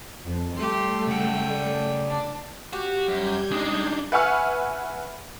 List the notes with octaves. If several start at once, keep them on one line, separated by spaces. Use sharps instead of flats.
F2
G3 A3 G4 C6
C#3 F#5 G5
D5
D4
F#4 G4
F#2 G3 G6 G#6
G#3 D4 D#4 G#4
B4 E5 F#5 G#5 C#6 F6